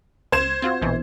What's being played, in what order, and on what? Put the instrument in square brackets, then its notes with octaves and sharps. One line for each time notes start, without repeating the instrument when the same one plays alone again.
[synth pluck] C#2 [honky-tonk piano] C5 G#6 E7
[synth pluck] C4 F4 F#4
A#1 B2 E3